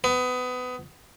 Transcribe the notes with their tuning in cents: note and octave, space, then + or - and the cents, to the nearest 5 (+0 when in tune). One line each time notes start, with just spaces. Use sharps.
B3 +25